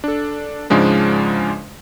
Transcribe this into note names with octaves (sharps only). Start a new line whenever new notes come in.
D4 A4
G#2 C#3 F3 G#3 D4